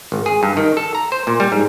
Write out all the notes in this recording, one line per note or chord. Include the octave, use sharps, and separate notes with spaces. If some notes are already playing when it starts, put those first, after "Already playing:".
G#1
G#4
G2
D#3
A4
A#5
C5
A#2
G3
G#2